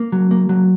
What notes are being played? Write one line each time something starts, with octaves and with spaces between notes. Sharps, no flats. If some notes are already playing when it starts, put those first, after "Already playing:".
Already playing: A#3
F#3
A#3
F#3